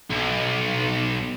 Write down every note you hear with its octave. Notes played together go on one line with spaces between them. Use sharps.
B1